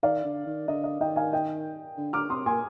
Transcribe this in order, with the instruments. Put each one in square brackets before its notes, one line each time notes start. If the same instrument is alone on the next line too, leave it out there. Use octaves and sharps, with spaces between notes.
[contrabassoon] D#3 [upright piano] D5 F5
[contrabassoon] D3
D#3
[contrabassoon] D3 [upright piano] D#5
[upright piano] D#5
[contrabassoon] D#3 [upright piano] D#5 G5
[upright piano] F5 G#5
D#5 G5
[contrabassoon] D3
[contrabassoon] D3 [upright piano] D6 F6
[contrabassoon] C3 [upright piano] C6 D#6
[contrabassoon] A#2 [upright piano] G#5 C6